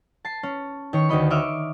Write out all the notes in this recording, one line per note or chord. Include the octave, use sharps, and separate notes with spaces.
A5 C7
C#4
D#3 C#5 C#6
D2 D#3 D#5 B5
C#5 D#5 E5 D6 F6